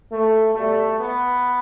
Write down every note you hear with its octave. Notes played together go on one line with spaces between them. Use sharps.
A3
B2 G3 A3
B3